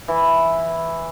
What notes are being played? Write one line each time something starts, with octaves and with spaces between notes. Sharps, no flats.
E3